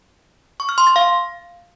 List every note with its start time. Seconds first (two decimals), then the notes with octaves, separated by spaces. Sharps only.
0.60 C#6
0.69 F6
0.78 C6
0.87 A6
0.96 F5